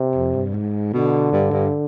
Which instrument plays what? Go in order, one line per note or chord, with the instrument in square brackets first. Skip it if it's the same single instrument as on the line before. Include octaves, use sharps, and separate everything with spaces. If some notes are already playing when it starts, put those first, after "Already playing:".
Already playing: [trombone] C3
[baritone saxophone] F2
G2
G#2
[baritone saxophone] B2 [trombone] D3
[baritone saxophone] G2
G2